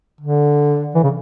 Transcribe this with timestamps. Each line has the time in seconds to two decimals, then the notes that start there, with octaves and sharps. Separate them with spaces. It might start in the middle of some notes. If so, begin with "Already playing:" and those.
0.21 D3
0.95 E3
1.04 C#3